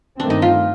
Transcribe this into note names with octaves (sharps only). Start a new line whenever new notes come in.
G2 D#3 A3 C4 D4
D#4
F4